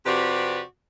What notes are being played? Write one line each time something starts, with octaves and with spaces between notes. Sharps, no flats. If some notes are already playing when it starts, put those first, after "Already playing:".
F2 C3 F#4 G4 B4 D5